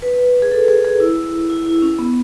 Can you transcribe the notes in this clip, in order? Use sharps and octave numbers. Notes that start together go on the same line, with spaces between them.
B4
G#4
A4
G#4
G#4
E4
E4
E4
C#4
B3